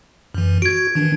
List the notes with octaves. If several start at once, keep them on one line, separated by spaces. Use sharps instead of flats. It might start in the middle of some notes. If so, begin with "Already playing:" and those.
F#2 E3
F#4 G#6 D7
D#3 E3 D4